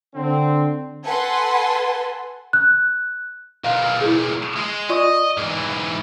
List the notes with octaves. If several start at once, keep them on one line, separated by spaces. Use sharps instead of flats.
D3 C4
A4 B4 F#5 G#5 A5 C6
F#6
B1 A#2 F5
E4 G#4
G#3
F4 D5 D#5 C#6
G#2 E3